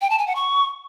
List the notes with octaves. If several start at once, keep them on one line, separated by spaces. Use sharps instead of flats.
G5
A5
G#5
F#5
C#6